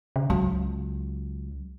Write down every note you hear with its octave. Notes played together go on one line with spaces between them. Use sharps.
C#3
C#2 F#3